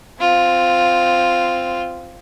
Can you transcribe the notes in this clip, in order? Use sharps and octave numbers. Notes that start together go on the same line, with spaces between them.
C4 F4